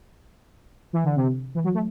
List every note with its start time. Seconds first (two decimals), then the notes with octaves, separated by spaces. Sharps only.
0.93 E3
1.04 D3
1.16 C3
1.55 E3
1.64 F#3
1.74 A3